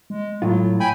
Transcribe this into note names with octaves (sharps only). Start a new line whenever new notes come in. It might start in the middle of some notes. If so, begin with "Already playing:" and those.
G#3
A2 F#3 F4
G5 G#5 B5